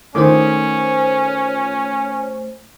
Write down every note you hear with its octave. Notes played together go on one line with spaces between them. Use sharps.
D#3 A3 C#4 F4 C5 D6